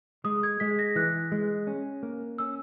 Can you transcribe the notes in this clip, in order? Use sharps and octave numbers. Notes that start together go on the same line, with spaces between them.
G#3 D#6
G#6
G#3 B6
A#6
E3 F#6
G#3
C#4
A#3
C#4 E6